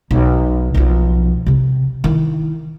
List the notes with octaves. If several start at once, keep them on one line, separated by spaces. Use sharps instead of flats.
B1 D#4
B1 F3
C3 C4
D#3 E4